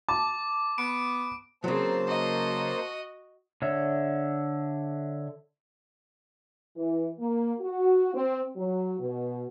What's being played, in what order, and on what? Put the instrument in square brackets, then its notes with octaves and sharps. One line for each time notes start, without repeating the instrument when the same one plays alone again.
[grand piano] A5 [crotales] D6
[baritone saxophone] B3 [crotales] D7
[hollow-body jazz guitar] C#3 F#3 [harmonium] A#3 C5 A5 [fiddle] C4
[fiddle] F#4 D#5
[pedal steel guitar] D3 C#5 E5
[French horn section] E3
A#3
F#4
C4
F#3
B2